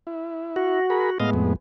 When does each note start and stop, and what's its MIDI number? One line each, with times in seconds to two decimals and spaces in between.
0.07 0.80 64
0.56 1.18 66
0.90 1.10 68
0.90 1.10 70
0.90 1.10 83
1.20 1.53 45
1.20 1.53 56
1.20 1.53 59
1.20 1.30 75
1.20 1.30 77
1.34 1.56 41